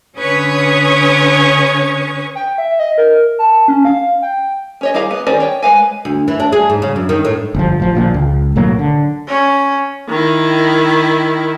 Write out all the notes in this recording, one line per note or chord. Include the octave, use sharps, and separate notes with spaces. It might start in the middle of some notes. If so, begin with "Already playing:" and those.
D3 C#4 B4 C#5 C#6 D#6
G5
E5
D#5
A#4
A5
C#4
F5
G5
C#4 C#5 D#5
G3 E4 G#4 F5 A#5
B3
D#3 C#4 G#4 C5 D5
C#5 G5
G#3 B4 F5 G#5
D2
E3
D4
G#4
G#2
C#3
F#2
D#3
A2
G1 F3
A1 F3
A#1 A#2 D#3 F3
C#2
B1 A2 F#3 A#3
D3
C#4
D#3 E4